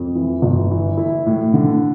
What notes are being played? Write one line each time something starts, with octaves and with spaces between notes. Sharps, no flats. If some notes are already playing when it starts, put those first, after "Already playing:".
Already playing: F2
E3
G1
E3
E4
A2
D3